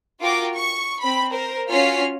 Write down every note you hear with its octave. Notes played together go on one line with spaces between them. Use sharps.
F4 F#4 A#4 G5 D6
C#6
C4 B5
A#4 C5
C#4 F4 F#4 F6 B6 C7